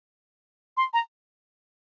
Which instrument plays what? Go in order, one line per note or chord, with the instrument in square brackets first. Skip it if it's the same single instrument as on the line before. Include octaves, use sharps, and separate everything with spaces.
[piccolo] C6
A#5